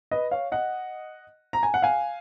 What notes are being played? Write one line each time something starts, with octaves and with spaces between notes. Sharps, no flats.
B4 D#5
C#5 F5
D#5 F#5
A#5
G#5
F#5
F5 G#5